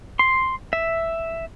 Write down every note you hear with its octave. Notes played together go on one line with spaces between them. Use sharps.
C6
E5